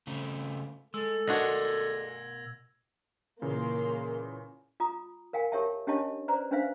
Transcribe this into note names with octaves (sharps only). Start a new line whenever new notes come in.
C#3 A3 C4
G#3 A4 E6
B2 G#3 D4 F#4 A#4 G#6 A#6
A#2 C#3 E3 A#3 C6
F4 A#5 D#6
A#4 F5 G5 G#5
G4 A#4 C#5 E5 G5 A5
C#4 D4 G4 C#5 D#5 A5
B4 C5 D5 A#5
C#4 D4 B4 C5 E5 F5